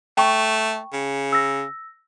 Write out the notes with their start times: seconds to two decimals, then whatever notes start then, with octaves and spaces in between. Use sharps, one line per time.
0.17 A3 G5 A5 C#6
0.92 C#3
1.32 E6 A#6